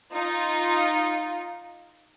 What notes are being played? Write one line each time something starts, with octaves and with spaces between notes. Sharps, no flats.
D#4 F4